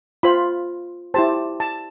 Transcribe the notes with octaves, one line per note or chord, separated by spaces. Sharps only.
F4 C5 B5
E4 G4 C5 A5
A5